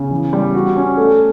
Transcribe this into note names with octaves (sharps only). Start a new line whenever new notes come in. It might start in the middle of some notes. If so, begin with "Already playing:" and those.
Already playing: C#3
E3
G3
F#4
C#4
A3